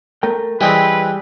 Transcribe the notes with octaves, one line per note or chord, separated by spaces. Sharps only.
A3 A#4 G5
E3 G3 G#3 C4 B4 G5